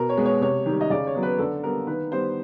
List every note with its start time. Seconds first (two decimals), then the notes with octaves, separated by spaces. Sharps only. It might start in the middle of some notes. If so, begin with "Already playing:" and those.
Already playing: B2 A#4
0.09 C#5
0.17 G#3 B3
0.25 C#5
0.41 C3 C#5
0.66 D#3 G3
0.81 D#5
0.90 C#3 D5
1.07 C#5
1.15 F#3 B3
1.23 B4
1.38 D3 A4
1.63 G3 B3 A#4
1.87 D#3 B4
2.12 G3 B3 C5